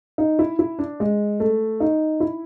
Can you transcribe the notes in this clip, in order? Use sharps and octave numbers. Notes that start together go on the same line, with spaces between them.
D#4
E4
E4
D4
G#3
A3
D#4
E4